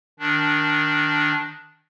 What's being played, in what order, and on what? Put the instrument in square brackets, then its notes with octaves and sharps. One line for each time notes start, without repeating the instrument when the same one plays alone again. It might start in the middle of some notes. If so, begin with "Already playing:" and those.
[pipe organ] D#3 D4